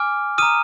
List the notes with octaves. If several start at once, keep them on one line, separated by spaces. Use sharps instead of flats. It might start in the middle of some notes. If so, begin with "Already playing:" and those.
Already playing: G#5 D6 F6
A#5 D#6 F6 D#7